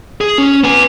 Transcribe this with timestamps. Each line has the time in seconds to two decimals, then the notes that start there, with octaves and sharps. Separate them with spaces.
0.21 G#4
0.38 C#4
0.64 B3 G#5